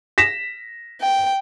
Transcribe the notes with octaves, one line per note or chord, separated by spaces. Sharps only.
A#6 B6 E7
G5